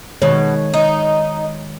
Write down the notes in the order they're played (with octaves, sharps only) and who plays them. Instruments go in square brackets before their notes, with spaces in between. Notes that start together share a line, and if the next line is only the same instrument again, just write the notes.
[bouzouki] B2 [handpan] D#3 G#3 C#5
[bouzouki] D#4